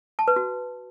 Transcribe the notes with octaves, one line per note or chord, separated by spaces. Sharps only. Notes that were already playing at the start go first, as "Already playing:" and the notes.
A5
B4
F#4